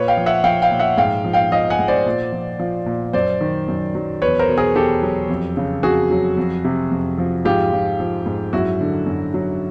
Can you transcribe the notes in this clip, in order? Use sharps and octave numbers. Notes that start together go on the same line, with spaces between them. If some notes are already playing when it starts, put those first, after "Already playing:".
Already playing: A#2 B4 C#5
F5 G5
F3
E5 F#5
F3 F5 G5
F5 G5
A#2
E5 F#5
G#2 F5 G5
F3
F5 G5
F3 D#5 F5
F#5 G#5
G#2
C5 D5
A#2
F3
F3
A#2
F#2 C5 D5
D#3
F#2
F#3
E2 B4 C#5
A#4 C5
B2
G#4 A#4
E2 G4 A4
F#3
F2
C#3
F2 F#4 G#4
F#3
F2
C3
F2
F3
G#2 F4 G4
F3
F3
G#2
F#2 E4 F#4
D3
F#2
F#3